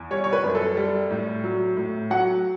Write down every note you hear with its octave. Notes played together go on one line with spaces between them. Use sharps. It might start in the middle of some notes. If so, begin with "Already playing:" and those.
Already playing: E2
G3 C#5
C#5
B4
F#2
A4
G3
A2
F#3
A2
F#3 F#5